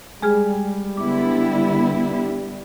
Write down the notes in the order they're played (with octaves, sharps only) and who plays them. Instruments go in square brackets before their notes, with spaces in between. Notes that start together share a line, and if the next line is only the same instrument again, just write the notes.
[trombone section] G3 [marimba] G#3 G#4 F6
[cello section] D3 B3 E4 [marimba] D6